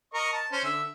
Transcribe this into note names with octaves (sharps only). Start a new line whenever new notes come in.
A#4 D#5 C#6
A5
C#4 C5
D3 E5